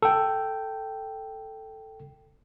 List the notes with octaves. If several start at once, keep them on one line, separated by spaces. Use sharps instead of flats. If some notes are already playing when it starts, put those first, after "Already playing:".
A4 G5